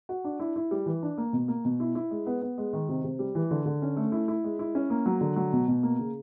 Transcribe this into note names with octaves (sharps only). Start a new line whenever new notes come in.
F#4
D4
E4
E4
G3
E3
D4
A#3
B2
A#3
B2
E4
E4
G#3
B3
B3
G#3
D#3
C3
C3
G3
E3
D3
D3
C#4
A3
E4
E4
G#3
E4
C#4
A#3
F#3
D3
F#3
B2
B2
A#3
C#3